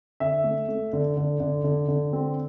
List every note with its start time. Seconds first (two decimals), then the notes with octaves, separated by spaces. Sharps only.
0.20 D3 E5
0.44 A3
0.68 A3
0.93 D3
1.17 D3
1.40 D3
1.64 D3
1.88 D3
2.13 C4